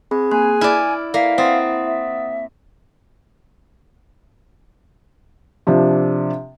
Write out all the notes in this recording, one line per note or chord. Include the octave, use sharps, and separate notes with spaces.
C4 G#4 B5
A#3 G#5 C6 F#6
E4 D5 F6
A#3 E4 D5 F5 B6
C4 F#5 D#6 A6
E5
C3 F3 D4